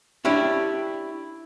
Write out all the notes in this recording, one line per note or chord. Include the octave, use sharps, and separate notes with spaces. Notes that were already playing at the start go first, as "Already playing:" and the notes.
C#4 D4 E4 G4